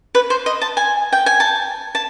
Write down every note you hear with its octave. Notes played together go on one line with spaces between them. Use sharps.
B4
C5
D#5
A5
G#5
G5
G#5
A5
A5